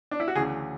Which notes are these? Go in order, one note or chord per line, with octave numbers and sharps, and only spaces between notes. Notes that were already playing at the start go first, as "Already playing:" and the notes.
D4
E4
F#4
D2 C#3 E3 G#4